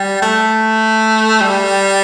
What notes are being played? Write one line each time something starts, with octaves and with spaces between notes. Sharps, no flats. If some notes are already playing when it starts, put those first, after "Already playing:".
Already playing: G3
A3
G3